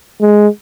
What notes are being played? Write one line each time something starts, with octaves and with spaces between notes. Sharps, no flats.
G#3